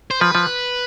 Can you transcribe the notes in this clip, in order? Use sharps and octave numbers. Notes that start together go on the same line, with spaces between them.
C5
F3 B4
F3